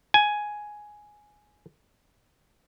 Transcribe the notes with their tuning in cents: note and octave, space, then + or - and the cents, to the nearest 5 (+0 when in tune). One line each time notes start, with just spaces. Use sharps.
G#5 +5